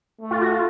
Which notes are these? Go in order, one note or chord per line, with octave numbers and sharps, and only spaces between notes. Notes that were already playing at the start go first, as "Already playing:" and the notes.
A3
F4
F#4
F4